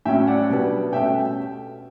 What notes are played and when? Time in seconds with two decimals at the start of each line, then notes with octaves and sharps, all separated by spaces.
0.05 A2 F#3 C#4 E5 G5
0.27 D5 F#5
0.50 B2 G3 B3 D4
0.93 B2 A3 C#4 E5 G5